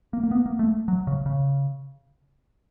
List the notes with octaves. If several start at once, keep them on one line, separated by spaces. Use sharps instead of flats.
A#3
A#3
B3
A#3
A3
F#3
C#3
C#3